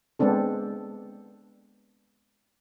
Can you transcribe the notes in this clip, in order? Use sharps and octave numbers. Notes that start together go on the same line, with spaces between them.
G#3 B3 C4 D4 A4